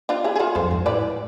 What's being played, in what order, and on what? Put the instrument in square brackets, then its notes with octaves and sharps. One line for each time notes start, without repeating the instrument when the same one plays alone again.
[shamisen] D4 F4
E4 G#4
G#4
F4 A4
[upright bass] F2 [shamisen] A4 C5
[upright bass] G#2
[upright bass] A2 [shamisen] B4 D5